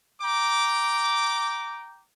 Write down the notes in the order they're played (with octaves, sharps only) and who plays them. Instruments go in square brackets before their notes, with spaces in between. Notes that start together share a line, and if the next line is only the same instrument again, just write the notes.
[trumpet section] G5 A#5 D6